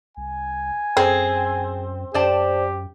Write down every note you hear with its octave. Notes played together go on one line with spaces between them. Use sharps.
C2 G#5
F#2 C4 G#4
F#2 G4 C5 D5 A5